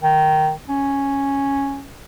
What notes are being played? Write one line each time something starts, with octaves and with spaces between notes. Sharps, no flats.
D#3
C#4